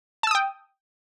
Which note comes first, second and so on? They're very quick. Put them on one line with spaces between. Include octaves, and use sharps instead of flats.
A5 E6 D#6 G5